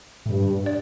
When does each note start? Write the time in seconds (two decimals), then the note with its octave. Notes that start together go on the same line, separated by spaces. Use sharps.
0.26 A2
0.30 G2
0.66 D5